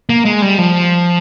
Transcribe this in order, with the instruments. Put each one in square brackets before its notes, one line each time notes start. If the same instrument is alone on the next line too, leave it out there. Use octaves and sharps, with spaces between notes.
[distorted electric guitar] A#3
G#3
G3
F3